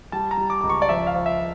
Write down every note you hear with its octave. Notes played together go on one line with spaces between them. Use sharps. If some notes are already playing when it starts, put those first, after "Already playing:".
G3 A5
A#5
G3
D6
C#2 D6
C#6
D5
F3 E5
F5
F3
E5